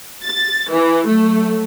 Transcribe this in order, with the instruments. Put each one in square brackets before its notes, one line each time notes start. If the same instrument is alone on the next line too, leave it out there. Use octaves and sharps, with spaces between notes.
[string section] A6
E3
F#3 A3